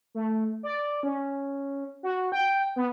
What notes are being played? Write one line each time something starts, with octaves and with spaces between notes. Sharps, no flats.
A3
D5
C#4
F#4
G5
B3